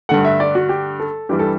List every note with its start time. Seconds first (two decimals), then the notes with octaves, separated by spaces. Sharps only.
0.09 G2 D3 A3 F#5
0.25 E5
0.40 D5
0.55 F#4
0.69 G4
1.00 A4
1.29 G2 E3 G3 G4
1.39 A4